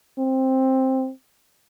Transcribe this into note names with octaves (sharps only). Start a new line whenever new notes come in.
C4